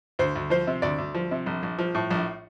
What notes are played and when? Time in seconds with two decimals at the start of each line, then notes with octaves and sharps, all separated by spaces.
0.19 D2 C5
0.35 D2
0.50 F3 C5
0.67 C3
0.82 D2 D5
0.98 D2
1.15 F3
1.31 C3
1.46 A#1
1.63 A#1
1.79 F3
1.95 A2
2.11 A#1